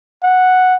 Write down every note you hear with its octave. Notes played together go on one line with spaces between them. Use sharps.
F#5